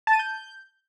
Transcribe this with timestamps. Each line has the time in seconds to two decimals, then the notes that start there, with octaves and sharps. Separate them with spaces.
0.07 A5
0.13 D#7
0.19 G6